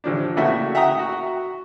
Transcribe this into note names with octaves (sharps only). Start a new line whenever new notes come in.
A1 F3 D4
A2 C#3 A3 A#3 F#4 E5
E5 F#5 G5 A#5 D#6
F#4